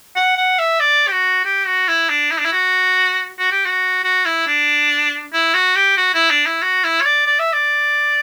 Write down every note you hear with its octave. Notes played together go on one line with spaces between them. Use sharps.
F#5
F#5
E5
D5
G4
F#4
G4
F#4
E4
D4
E4
D4
E4
F#4
F#4
G4
F#4
F#4
E4
D4
E4
F#4
G4
F#4
E4
D4
E4
F#4
E4
C#5
D5
D5
E5
D5